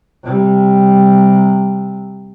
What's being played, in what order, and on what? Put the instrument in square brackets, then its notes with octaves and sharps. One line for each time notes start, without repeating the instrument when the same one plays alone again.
[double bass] C3 G3